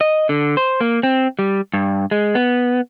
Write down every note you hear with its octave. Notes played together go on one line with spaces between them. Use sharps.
D#5
D3
C5
A#3
C4
G3
G2
G#3
B3